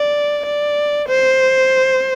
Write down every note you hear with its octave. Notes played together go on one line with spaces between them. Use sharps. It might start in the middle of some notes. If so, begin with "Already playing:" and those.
Already playing: D5
D5
C5